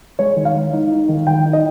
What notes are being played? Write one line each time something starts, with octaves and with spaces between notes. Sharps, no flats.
G#3 C#5
D#3
F5
G#3
D#4
D#4
D#3
D#3 G5
D#4
D#5